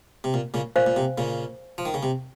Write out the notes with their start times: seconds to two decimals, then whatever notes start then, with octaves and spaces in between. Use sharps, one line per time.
0.24 C3
0.34 A#2
0.54 A#2 C#3
0.76 A#2 C5 F5 G#5
0.86 A#2
0.96 C3
1.18 A#2 C#3
1.78 F3
1.85 D#3
1.94 C#3
2.03 C3